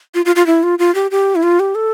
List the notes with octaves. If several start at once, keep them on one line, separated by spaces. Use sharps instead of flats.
F4
F4
F4
E4
F4
F4
G4
G4
E4
F4
G4
A4